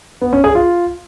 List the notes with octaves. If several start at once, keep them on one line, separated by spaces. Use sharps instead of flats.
B3
C#4
G#4
F4